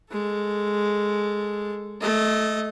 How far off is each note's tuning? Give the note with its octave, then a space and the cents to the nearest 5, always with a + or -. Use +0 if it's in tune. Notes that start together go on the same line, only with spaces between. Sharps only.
G#3 +0 A4 +0
A3 -15 D#5 +0